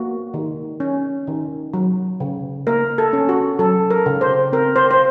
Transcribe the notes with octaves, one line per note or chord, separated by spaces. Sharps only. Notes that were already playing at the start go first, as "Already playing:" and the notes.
Already playing: A#3 F#4
D#3
C#4
D#3
F#3
C#3
A#3 A#4
A4
C#4
F#4
F#3 A4
A#4
C#3
C5
C4 A#4
C5
C5